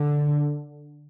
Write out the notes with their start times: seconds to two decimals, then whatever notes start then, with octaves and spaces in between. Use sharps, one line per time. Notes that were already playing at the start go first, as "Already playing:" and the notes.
Already playing: D3